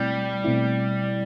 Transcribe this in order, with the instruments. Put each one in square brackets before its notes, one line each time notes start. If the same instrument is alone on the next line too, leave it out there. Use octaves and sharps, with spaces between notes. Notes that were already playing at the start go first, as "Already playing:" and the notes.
Already playing: [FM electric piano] B2 A3 C4 E4 [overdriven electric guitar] G3
[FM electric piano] B2 A3 C4 E4